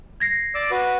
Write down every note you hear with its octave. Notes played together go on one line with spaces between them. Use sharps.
G#6 A#6 C7
D5 D6 E6
F#4 B4